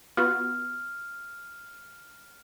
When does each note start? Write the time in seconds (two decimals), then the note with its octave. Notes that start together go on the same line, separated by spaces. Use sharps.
0.17 B3 F4 F#4 F6